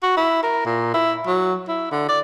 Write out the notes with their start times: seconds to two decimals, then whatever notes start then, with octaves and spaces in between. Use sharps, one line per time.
0.03 F#4
0.17 E4
0.43 A#4
0.66 A#2
0.94 E4
1.27 F#3
1.68 E4
1.91 D3
2.09 D5